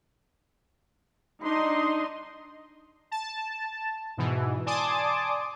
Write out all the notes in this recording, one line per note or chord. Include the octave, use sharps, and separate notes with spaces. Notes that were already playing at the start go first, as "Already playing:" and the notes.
D4 D#4 D#5 C6
A5
G#2 B2 E3
D5 G#5 A5 C6 D6 D#6